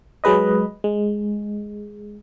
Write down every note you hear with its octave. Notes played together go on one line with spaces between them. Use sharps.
F#3 G#3 B4 D#5
G#3